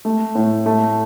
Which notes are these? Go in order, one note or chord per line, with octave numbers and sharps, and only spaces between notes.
A3
A2
A3